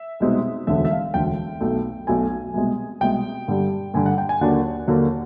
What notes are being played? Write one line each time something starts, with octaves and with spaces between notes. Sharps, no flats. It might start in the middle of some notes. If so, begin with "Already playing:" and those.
Already playing: E5
C2 B2 G#3 C4 D#4
E1 D2 D3 E5
E5
F5
E1 D2 D3 G5
B1 B2 F#3 A3
B1 B2 F#3 A3 G#5
C2 B2 G#3
C2 B2 G#3 G5
G2 D3 G3
G2 D3 G3 G#5
F#5
G5
G#5
D#2 D3 F#3 A#3 D4 F#5
D#2 D3 F#3 A#3 D4